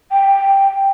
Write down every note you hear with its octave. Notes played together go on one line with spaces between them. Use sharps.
G5